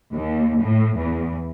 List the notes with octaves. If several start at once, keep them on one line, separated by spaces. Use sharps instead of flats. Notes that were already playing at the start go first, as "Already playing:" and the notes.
D#2
A2
E2